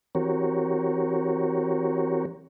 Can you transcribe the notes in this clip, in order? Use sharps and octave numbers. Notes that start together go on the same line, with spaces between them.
E3 C4 F#4 G4 A#4 C#5